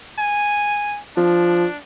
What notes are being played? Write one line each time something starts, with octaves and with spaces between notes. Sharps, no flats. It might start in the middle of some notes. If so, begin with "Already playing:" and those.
G#5
F3 D4